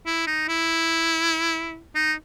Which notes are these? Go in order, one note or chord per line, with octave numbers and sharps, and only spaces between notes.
E4
D#4
E4
D#4